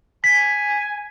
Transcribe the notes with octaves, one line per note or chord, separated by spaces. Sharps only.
G#5 B6